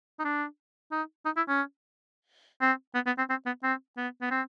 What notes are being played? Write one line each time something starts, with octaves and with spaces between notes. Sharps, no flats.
D#4
D4
D#4
D#4
E4
C#4
C4
B3
B3
C4
C4
B3
C4
B3
B3
C4